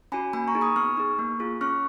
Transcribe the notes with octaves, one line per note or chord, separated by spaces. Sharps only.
C#4 F#4 G#5 B5
A#3 G#5 B5
A#5 C#6
D#4 G#4
B5 D#6
B3 C#6 F6
D#4 G#4
A#3
F4 G#4
C#4 C#6 F6